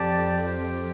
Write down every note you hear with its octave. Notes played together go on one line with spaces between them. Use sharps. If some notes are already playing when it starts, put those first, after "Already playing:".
Already playing: F2 G4 D5 A5
G4 C5 G5